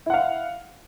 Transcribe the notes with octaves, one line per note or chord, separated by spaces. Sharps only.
E4 F5 F#5